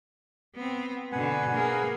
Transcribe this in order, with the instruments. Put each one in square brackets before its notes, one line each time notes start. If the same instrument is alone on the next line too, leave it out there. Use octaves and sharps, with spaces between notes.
[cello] B3 C4
[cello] B2 D3 [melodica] B4 F#5 G#5
[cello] A#3 [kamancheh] G#4 A#4